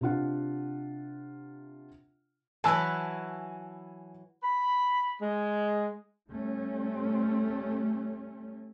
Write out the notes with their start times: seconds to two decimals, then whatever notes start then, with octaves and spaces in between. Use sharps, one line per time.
0.01 C3 D4 F4 F#5
2.64 E3 F#3 B4 G#5 A5 E6
4.43 B5
5.22 G#3
6.29 G3 A3 C#4